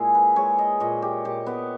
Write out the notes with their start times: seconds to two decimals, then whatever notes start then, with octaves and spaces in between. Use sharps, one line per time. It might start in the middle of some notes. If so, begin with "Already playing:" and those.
Already playing: A#2 G#3 E4 G#4
0.15 B4
0.36 G#3 C#5
0.59 D#5
0.80 A#2 D#5
1.02 G4
1.25 A#2 G4
1.46 B3